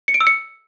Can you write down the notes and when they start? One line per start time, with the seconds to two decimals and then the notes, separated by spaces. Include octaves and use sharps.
0.08 C#7
0.14 D7
0.21 E6
0.27 C#7